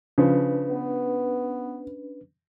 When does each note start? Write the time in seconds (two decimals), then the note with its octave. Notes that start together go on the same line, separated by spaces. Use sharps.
0.18 C#3 F3 C#4 D4 B4
0.70 B3